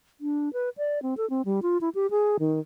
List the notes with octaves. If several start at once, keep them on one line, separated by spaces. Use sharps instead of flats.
D4
B4
D5
C4
A4
C4
G3
F4
E4
G4
G#4
D#3